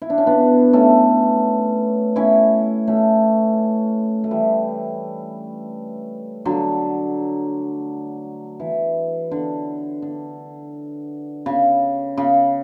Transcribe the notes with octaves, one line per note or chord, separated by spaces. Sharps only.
E4
D4
C#4
B3 D4
A3 C#4
C#4 E4
A3 C#4
A3
E3 G3
D3 F#3
E3
D3
D3
C#3
C#3